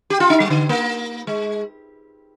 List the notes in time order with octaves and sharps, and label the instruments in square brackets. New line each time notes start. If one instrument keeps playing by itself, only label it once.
[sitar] G4
F4
D#4
G3
D3
A#3
G#3